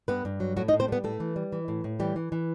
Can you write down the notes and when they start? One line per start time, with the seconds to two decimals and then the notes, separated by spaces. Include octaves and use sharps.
0.08 G2 B3 B4
0.25 G2
0.40 F#3
0.57 A2 F#3 F#4
0.68 D#4 D#5
0.73 A2
0.80 C4 C5
0.88 G3 B3 B4
1.04 A2 A3 A4
1.20 E3
1.36 G3
1.52 E3
1.68 A2
1.84 A2
2.00 E3 G3 G4
2.16 E3
2.32 E3